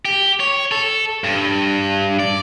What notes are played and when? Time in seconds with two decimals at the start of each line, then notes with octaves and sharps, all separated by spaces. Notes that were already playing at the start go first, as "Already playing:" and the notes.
0.05 G4
0.40 C#5
0.71 A4
1.24 G2
2.19 D5